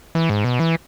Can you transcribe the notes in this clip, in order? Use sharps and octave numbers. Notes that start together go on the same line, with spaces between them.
E3
G#2
B2
E3